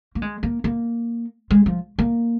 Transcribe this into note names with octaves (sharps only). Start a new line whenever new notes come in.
A#3
G#3
A#3
A#3
G#3
F3
A#3